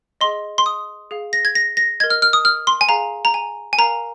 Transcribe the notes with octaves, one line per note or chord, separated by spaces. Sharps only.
G#4 D#5 C6
C6
D#6
G#4 F5
A#6
G#6
A#6
A#6
A#4 D#5 G#6
F6
F6
D#6
F6
C6
G#5
G#4 F5 A#5
A#5
G#5
G#5
A#4 F5 A#5